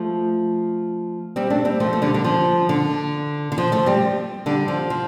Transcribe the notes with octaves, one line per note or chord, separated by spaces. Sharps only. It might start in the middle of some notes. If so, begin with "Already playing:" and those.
Already playing: F3 A3
G3 C4
A3 D4
G3 C4
F3 A3
A3
D3 G3
D3
F3
D3
D3
F3
F3 A3
G3 C4
D3 G3
F3
F3